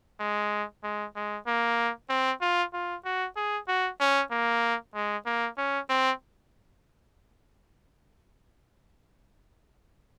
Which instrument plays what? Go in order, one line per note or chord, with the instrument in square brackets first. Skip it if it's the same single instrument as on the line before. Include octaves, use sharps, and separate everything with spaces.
[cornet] G#3
G#3
G#3
A#3
C4
F4
F4
F#4
G#4
F#4
C#4
A#3
G#3
A#3
C#4
C4